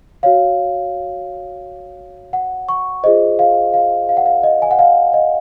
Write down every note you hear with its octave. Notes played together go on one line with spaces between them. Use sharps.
F#4 C#5 F5
F#5
C#6
F4 G#4 C5 D#5
F5
F5
F5
F#5
F5
D#5
G#5
F#5
F5
D#5